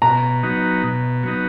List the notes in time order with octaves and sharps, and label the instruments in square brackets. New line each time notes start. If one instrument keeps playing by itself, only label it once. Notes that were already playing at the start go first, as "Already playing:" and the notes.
[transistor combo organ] B2 [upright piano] A#5
[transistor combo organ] F#3 B3 D#4
B2
F#3 B3 D#4